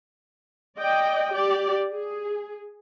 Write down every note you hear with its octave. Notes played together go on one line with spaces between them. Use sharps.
D5 D#5 G5
G4 D5
G#4